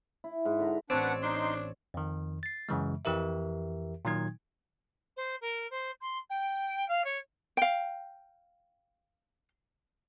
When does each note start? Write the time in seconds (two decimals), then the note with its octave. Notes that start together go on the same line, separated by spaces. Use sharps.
0.24 E4
0.45 G#2
0.59 D3 F#4 B4 A#5
0.90 A1 C4 D4 B4 C#5 D5 F#5
1.22 D4 D#4 C6
1.94 F2 D#3
2.43 A6 C7
2.69 F#2 C#3 E3 G#3
3.05 F2 E3 G4 A#4 E5
4.05 A#2 D#3 F#3 D#4 G#6
5.16 C5
5.41 A#4
5.70 C5
6.01 C6
6.30 G5
6.88 F5
7.04 C#5
7.57 F5 G5